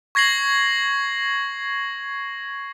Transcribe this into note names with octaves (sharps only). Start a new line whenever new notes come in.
C#6 G#6 A#6 C7 F#7